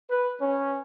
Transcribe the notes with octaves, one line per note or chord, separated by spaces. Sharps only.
B4
C#4